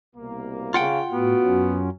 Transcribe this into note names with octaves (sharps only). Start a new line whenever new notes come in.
C2 B2 A#3
C#3 F4 F#5 G5
A2 B3 F#4
F#2 F#3 C#4